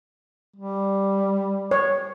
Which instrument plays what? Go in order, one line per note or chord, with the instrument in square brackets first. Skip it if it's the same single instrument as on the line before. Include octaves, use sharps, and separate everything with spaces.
[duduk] G3
[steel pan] C#5